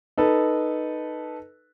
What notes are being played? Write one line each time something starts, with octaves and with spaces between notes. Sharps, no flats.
D#4 A4 B4